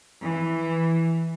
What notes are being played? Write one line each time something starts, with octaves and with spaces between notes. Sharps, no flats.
E3